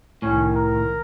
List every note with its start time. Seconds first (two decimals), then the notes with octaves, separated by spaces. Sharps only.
0.22 C2 A2 D#3 C#4
0.55 A#4